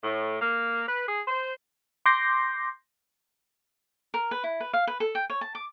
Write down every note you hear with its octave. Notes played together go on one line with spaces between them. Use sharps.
A2
A#3
B4
G#4
C5
C6 D6 G6 A#6 C7
A#4
B4
E4
B4
F5
B4
A4
G5
C#5
A5
D6